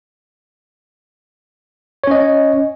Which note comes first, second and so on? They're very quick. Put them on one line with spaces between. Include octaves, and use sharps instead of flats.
C#5 C#4 D#5